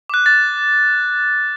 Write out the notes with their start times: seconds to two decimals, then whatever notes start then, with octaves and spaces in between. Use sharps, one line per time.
0.10 D6 F#6
0.26 A6